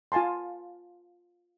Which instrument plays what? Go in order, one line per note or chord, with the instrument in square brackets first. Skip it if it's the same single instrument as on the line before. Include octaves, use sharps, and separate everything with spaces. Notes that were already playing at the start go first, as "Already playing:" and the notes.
[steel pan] F4 F5 G#5 A5 C6